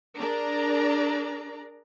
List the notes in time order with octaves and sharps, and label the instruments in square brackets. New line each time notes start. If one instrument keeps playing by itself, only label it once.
[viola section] D4 G#4 A#4 D5 A#5